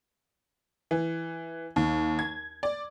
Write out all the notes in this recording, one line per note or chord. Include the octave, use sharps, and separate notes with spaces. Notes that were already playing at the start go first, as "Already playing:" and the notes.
E3
D#2
G#6
D5